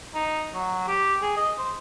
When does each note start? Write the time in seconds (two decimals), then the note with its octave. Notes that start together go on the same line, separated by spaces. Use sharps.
0.14 D#4
0.54 F#3
0.88 G4
1.22 G#4
1.36 D#5
1.58 C5